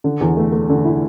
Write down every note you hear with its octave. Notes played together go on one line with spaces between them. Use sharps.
D3
E2
A3
A3
D3
E4